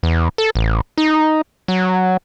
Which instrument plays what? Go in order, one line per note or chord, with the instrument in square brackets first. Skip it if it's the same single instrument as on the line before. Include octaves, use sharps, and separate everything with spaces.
[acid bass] E2
A4
A1
D#4
F#3